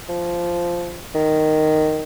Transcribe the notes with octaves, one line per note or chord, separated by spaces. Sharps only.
F3
D#3